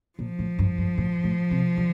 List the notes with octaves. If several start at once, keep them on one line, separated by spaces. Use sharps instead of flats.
A#2 F3
A2
G2
G2
A2
A2
C3
D3